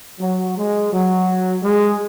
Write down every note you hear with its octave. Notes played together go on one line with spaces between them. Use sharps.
F#3
G#3
F#3
G#3